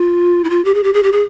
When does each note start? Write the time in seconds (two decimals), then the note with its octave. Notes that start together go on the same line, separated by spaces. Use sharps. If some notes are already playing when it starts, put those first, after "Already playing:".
Already playing: F4
0.44 E4
0.50 F4
0.65 G4
0.74 G#4
0.83 G4
0.94 G#4
1.03 G4
1.12 G#4